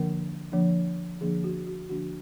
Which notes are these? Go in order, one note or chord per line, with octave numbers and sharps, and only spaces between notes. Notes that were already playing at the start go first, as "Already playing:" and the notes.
Already playing: D3 F3 A#3 D4 A#4
D3 F3 A#3 D4
D3 F3 A#3 D4 G#4
F#4
F#4
D3 F3 A#3 D4 F#4